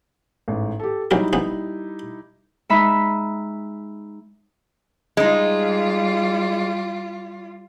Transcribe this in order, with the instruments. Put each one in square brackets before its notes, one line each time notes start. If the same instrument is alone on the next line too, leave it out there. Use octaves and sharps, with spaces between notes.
[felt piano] A1 G#2
G4 A4
[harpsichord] A#1 F#3 A#4 [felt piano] G3 D#4 E4
[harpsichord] A#1 B3
[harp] G#3 D#4 E5 B5
[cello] G3 F4 [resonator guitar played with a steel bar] G#3 D#4